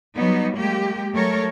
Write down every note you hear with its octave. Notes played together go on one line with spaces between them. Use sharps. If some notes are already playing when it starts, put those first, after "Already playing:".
F#3 G3 B3 D#4
G#3 A#3 G4
F#3 A3 A4 A#4 C#5